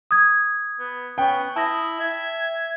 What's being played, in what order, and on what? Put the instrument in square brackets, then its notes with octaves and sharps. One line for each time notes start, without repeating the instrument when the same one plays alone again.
[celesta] D#6 G#6
[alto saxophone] B3
[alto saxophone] B3 [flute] C#4 [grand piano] G5
[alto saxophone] E4 [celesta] A5 A#6 [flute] D#6
[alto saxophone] E5 [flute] G#6